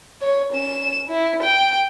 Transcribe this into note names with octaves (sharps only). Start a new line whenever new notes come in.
C#5
C#4 E7
E4
G5